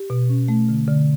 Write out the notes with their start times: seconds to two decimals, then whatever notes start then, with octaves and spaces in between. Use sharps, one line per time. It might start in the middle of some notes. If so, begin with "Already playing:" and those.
Already playing: G4
0.10 B2
0.29 C#4
0.48 A3
0.69 D3
0.88 D3